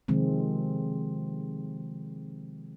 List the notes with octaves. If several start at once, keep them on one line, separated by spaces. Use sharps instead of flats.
C3 D#3 F3 G#3 C4